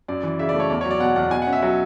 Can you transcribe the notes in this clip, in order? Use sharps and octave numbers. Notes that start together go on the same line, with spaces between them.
F#2 D5
E3
C#3 E5
D5
A3
C#5
E2 D5
C#5
F#3
D5
B2 F#5
E2 F#5
B2 G#5
F#5
C#4
E5
F#3 F#5